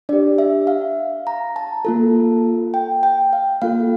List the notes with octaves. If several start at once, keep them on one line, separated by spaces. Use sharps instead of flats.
D4 G4 D5
E5
F5
A#5
A5
A#3 F4 A4
G5
G5
F5
A#3 F4 A4 F5